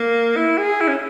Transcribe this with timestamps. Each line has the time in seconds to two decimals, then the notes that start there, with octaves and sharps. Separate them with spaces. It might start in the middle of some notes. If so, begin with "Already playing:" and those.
Already playing: A#3
0.36 E4
0.58 G#4
0.81 E4
0.88 C#4